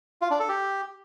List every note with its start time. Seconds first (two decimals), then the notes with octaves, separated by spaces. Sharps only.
0.21 F4
0.31 D4
0.40 A4
0.49 G4